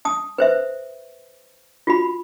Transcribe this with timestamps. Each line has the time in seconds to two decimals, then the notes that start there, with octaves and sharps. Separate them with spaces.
0.05 A5 D#6
0.38 B4 C5 E5
1.87 F4 F#4 B5